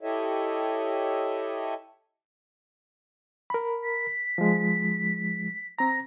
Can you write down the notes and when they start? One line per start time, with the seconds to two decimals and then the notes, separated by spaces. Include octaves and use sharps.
0.01 E4 G4 A4 C#5 D#5 E5
3.50 A#4 B5
3.83 B6
4.38 F3 G#3
5.79 C4 A#5 A#6